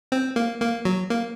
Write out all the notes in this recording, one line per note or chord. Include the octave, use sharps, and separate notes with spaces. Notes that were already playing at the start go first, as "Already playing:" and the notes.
C4
A#3
A#3
F#3
A#3